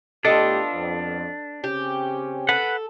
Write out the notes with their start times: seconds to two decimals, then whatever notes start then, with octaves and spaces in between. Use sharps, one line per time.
0.25 A2 A3 B3 D4 F4 G4 A4 D#5
0.73 F2
1.64 C#3 C4 C#4 G4
2.49 A4 B4 F#5